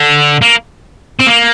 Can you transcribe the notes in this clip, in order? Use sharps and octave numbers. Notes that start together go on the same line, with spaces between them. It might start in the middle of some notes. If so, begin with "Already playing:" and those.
Already playing: D3
A#3
C4
A#3